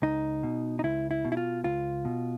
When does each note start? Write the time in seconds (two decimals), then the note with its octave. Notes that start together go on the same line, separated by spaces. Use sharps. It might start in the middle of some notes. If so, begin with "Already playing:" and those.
0.02 C#2 D#4
0.43 B2
0.79 D#4
0.84 C#2 E4
1.11 E4
1.25 B2
1.32 E4
1.37 F4
1.64 C#2 F4
2.05 B2